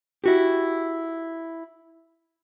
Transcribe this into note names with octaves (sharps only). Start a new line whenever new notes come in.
E4 F#4 G4